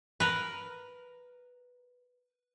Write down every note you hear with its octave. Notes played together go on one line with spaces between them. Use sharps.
A#4 B4